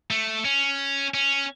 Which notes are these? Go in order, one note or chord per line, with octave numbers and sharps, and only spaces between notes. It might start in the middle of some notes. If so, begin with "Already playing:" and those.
A3
C#4
C#4